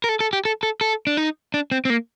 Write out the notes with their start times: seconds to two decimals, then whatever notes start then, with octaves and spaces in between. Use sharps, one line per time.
0.04 A#4
0.09 A4
0.20 A4
0.33 G4
0.45 A4
0.63 A4
0.81 A4
1.07 D4
1.17 D#4
1.54 D4
1.72 C4
1.85 C4
1.90 A#3